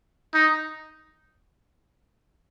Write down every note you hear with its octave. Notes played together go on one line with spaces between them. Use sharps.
D#4